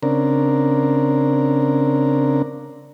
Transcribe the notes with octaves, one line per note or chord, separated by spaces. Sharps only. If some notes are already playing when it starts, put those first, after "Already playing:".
C#3 C4 D4 A#4